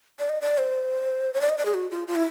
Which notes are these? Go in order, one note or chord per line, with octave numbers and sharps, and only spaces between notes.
D5
D#5
D5
C5
C#5
D5
D#5
D5
G#4
F#4
F4
F4
E4